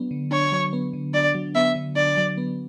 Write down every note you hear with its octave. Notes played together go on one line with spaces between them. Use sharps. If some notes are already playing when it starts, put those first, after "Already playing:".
Already playing: F#3 B3 D4
D3
D4 C#5
F#3
B3
D3
D4 D5
F#3
B3 E5
D3
D4 D5
F#3
B3